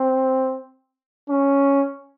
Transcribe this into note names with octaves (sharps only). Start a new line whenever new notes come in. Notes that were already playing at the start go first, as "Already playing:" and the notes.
Already playing: C4
C#4